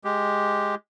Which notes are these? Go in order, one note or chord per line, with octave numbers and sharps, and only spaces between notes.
G#3 G4